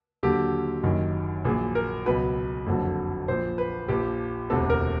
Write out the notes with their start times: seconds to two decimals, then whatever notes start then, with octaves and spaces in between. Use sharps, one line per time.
0.23 D#2 D3 F#3 G4
0.83 F#1 F#2 D#3
1.45 A#1 A#2 F#3 G#4
1.75 A#4
2.06 C#2 B2 F#3 B4
2.67 F#1 F2 D3 F#3
3.28 A#1 A#2 F3 C5
3.58 B4
3.88 A#1 A#2 F3 G4
4.50 E1 D2 C3 A4
4.70 A#4